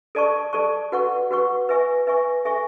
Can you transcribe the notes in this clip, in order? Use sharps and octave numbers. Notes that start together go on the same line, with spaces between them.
A4 D5 A5 C#6
A4 D5 A5 C#6
F#4 B4 F#5 C#6
F#4 B4 F#5 C#6
B4 E5 G#5 C#6
B4 E5 G#5 C#6
A4 E5 G#5 C#6